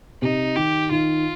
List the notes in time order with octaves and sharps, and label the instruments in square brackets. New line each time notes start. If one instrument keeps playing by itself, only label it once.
[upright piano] C3 [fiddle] D#4
[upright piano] D#3 [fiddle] G4
[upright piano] D#3 [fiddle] F4